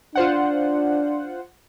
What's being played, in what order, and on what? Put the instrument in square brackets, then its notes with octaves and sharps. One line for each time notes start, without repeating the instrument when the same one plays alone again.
[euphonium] D4 [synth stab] F4 C5 F#5